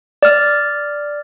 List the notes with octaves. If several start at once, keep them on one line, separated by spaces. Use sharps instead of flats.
D5 F6